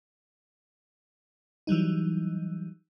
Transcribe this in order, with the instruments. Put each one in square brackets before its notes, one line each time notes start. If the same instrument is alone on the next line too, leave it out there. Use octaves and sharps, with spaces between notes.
[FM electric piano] E3 F#3 G3 D#4